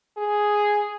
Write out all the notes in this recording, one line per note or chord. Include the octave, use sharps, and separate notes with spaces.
G#4